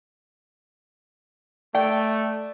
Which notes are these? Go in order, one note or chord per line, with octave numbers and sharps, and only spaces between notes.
A3 D5 G5